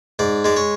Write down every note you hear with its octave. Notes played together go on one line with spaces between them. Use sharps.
G#2 D5
G#3 D5
C#5